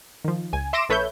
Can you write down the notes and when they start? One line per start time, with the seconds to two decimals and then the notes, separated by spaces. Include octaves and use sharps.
0.25 D#3 F3
0.53 C#2 G#5
0.73 E5 C6 D6 A#6 D7 E7
0.89 A#1 A4 B4 C#5 E5 G6